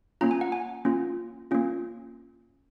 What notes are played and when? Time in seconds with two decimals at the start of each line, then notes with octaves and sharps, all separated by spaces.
0.21 A#3 C#4 F4 A#5
0.31 G#5
0.41 F#5
0.52 G#5
0.85 A#3 C#4 F4
1.51 A#3 C#4 F4